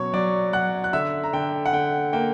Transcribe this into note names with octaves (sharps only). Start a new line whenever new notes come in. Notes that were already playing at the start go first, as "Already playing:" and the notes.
Already playing: B2 F#3 C#5 C#6
F#3 D5 D6
F#3 F#5 F#6
F#6
D3 E5 E6
A#5
D3 G5
F#5
D3 G5
A#3 G5